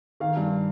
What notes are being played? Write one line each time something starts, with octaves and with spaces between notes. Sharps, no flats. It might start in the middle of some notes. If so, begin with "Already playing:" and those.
D#3 F5
G2